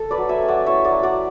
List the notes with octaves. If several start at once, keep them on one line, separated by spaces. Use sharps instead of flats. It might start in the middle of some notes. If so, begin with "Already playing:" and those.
Already playing: A4
B4 D5
F#3
E5 G#5
C#4
D5 F#5
E4 C#5 E5
D5 F#5
F#3
D5 F#5